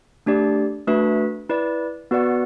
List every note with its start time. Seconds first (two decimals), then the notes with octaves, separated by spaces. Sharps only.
0.26 A3 D4 G4 D5
0.87 A3 D4 F#4 B4 E5
1.49 E4 B4 D5
2.11 B3 F#4 B4 D5 F#5